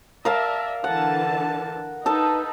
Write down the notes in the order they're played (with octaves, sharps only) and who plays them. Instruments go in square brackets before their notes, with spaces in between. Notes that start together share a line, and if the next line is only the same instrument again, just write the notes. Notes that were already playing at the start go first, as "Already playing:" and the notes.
[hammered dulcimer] A#4 F5 A5 [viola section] D5 E5
[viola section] D3 E3 A5 [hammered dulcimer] F#5
[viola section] D#4 B4 [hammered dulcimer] A4 A5